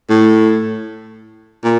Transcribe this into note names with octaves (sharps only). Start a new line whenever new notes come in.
A2
A#2